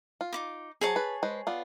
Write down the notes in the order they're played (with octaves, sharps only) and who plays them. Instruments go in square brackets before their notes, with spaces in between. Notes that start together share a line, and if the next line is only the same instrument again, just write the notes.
[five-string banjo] F4
[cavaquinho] D#4 E4 D6
[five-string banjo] F#3 G#3 C5 [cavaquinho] G#4 C#5 A5
[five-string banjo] B4
G#3 B4 C5
B3 F4 D5